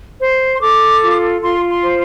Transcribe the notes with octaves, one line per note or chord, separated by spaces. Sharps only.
C5
C6
A4 D6
F4
F4 C6
C6
C5